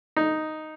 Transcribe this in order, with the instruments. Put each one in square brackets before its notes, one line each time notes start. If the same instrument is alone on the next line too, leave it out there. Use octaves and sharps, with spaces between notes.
[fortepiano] D#4